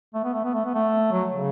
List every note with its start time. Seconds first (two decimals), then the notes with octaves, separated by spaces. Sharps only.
0.14 A3
0.24 B3
0.34 A3
0.44 B3
0.54 A3
0.65 B3
0.75 A3
1.12 F#3
1.33 C#3